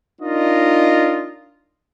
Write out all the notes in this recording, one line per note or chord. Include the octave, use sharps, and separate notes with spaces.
D4 D#4 F4 A#4 D#5